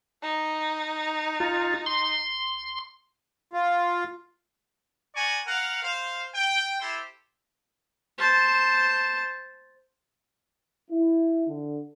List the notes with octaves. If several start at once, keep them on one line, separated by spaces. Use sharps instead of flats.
D#4
F4
C6
F4
D5 F#5 G#5 A#5 C#6
A#4 F5 F#5
C5 F5
G5
E4 G4 A4 C5
C5 A5
E4
D3